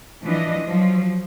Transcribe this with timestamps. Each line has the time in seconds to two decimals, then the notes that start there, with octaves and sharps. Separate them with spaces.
0.23 E3 F3 D4 D#5
0.64 F3 F#3